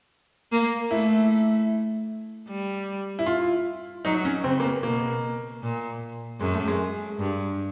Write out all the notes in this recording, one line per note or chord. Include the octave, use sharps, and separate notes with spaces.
A#3
A3 E4
G3
E4
F4
F#3 D#4
C#4
C#3 C4
A#3
B3
B2 A#3
A#2
F#2 G#3
A3
G#3
G2